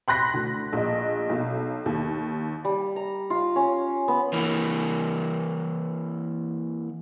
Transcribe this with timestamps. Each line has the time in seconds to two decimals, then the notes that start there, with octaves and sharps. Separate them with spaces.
0.08 B5 C6 F#6 A#6 B6
0.34 D2
0.73 A#1 D#5
1.29 B1
1.86 D#2
2.65 G3
2.96 A#5
3.30 F4
3.56 C#4
4.08 B3
4.33 E3 A#3